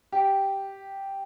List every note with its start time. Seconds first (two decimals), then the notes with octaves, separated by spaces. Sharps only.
0.12 G4